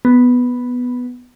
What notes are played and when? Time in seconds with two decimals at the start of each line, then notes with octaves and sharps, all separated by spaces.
0.05 B3